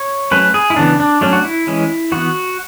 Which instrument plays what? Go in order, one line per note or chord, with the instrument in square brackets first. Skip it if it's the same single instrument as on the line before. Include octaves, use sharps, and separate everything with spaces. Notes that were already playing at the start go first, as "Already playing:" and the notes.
Already playing: [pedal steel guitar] C#5
F#3 A3 C#4 B4
G#4
E4
C#3 E3 B3 D4
D4
F#3 A3 C#4 D4
F#4
E4
E3 G#3 C#4
E3 B3 F#4